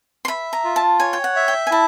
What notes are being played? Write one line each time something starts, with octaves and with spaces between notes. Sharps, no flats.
C6
E5 B5
A#5
F4
A5
C#5 G#5
G5
F#5
E5
G5
G#5
E4 A5